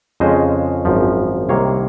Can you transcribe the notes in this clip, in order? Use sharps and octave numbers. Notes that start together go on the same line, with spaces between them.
F2 C#3 G#3 C#4 C5 D#5
G#1 F#2 F3
C2 C3 D#3 A#3 C#5 F5